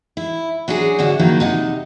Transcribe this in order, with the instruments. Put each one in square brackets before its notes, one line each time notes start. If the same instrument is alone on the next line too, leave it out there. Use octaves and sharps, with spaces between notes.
[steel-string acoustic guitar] E4
F#3 C#4 D4 G#4
G#2 D3 C#4 F#4 E5
D#3 F3 F#3 A#3 E4
C3 D#4 F#5